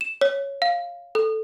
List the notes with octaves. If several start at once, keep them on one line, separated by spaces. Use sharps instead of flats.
E7
C#5
F5
A4